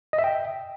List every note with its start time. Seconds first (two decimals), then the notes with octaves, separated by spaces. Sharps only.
0.13 D#5
0.19 E5
0.24 G5